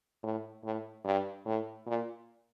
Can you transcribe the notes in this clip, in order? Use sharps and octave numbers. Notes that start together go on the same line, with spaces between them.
A2
A2
G2
A2
A#2